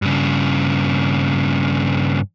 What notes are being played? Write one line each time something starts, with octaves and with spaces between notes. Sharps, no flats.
G2 C#3